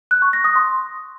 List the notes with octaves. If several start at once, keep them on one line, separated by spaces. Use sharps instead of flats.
F#6
C#6
A#6
D#6
C6